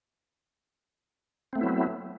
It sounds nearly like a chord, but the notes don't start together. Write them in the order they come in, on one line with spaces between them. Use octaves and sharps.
C4 A3 B3 E4 F#3